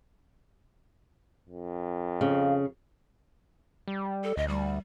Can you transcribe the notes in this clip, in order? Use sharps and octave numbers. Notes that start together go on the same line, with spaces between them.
F2
C#3 F5
G3
A4
D2 D#5
G3